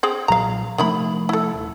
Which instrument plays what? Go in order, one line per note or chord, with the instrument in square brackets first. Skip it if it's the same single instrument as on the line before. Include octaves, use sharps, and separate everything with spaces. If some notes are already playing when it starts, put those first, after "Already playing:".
[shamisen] C4 G#4
[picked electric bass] B1 A#2 F#3 [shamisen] F5 A#5
[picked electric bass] C3 F3 A3 [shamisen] D#3 E4 B5
[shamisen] E4 A4
[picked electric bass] D#1